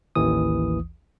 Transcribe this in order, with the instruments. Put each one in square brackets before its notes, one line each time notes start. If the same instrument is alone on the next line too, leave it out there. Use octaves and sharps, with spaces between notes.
[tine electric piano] A1 D#2 E3 D#6